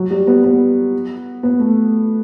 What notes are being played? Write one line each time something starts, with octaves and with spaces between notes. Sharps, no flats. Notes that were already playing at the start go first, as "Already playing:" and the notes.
Already playing: F#3
G3
B3
B3
B3
A3